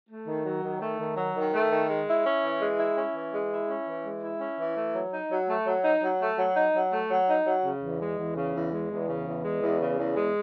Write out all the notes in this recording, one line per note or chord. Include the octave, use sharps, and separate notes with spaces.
A3
D#3
F#3
D#3
A3
D#3
F#3
D#3
A3
D#3
G#3
E4
C#4
E3
G#3
E4
C#4
E3
G#3
E4
C#4
E3
G#3
E4
C#4
E3
A3
F#3
D#4
F#3
A3
F#3
D#4
F#3
A3
F#3
D#4
F#3
A3
F#3
D#4
F#3
C#3
E2
G#3
E2
C#3
E2
G#3
E2
C#3
E2
G#3
E2
C#3
E2
G#3